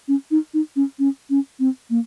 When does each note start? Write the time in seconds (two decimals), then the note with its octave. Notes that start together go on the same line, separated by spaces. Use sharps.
0.08 C#4
0.31 D#4
0.54 D#4
0.76 C#4
0.99 C#4
1.30 C#4
1.60 C4
1.90 A#3